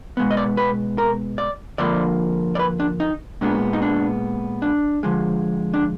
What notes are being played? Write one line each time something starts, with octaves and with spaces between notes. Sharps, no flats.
B2 G#3 B3
D#5
D5
B4
A#4
D5
D3 F3 A#3 D5
D5
B4
D4
D#4
A#2 G#3 B3 D4
D#4
D4
D4
D3 F3 G#3
D4